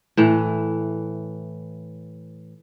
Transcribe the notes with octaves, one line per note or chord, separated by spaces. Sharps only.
A2 E3